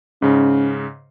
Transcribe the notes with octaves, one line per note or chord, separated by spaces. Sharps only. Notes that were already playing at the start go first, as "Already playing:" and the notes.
G#2 C#3 C#4